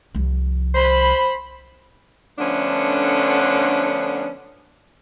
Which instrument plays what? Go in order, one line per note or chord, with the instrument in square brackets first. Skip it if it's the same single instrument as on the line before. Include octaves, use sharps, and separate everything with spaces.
[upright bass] C2 F3
[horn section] C5 B5
[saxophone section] D3 F3 A3 B3 C#4 D4